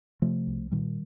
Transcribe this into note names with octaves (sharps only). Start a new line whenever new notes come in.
C3 F3 A3
C2
A#2 D#3 G3